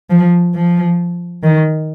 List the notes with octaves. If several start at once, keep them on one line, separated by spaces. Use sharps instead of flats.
F3
F3
D#3